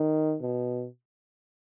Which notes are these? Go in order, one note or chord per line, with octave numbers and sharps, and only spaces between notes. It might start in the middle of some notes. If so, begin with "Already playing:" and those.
Already playing: D#3
B2